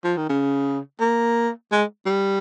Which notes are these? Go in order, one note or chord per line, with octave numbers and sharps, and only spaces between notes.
F3
D#3
C#3
A#3
G#3
G3